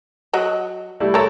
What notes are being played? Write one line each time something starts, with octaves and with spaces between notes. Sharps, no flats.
F#3 F#4 D#5
G3 A3 E4
A4 A#4 C#5 A5